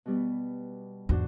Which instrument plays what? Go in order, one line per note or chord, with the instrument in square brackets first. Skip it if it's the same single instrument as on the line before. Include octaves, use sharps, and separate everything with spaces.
[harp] B2 G3 B3
[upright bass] E2 G#2 [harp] D4 F#4 C5